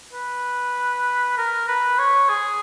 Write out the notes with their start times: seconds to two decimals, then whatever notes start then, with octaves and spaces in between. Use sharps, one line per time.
0.13 B4
1.38 A#4
1.68 B4
1.99 C#5
2.29 G#4